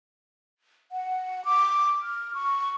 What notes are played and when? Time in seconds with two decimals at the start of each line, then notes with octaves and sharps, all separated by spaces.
0.92 F#5
1.45 D6
2.02 F6
2.34 C#6